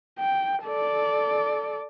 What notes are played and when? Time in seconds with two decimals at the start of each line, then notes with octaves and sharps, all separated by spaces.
0.19 G5
0.64 A4 D5